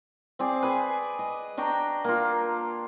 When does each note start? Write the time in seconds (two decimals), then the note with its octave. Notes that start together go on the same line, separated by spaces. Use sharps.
0.39 C4 G#4 D5
0.63 G#4 B4
1.19 D#5
1.57 D4 F#4 G5 A#5
2.04 A#3 F4